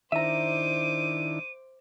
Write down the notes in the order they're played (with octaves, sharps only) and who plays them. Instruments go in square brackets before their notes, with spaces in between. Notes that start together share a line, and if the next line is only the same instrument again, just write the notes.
[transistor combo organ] D#3 D4 E4 [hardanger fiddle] C5 D6 [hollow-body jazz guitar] E5 A#5 [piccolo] D#7